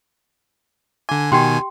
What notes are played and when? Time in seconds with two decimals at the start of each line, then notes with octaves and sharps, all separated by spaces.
1.09 D3 G#5 D6
1.32 B2 D#3 G4 G5 G#5 C6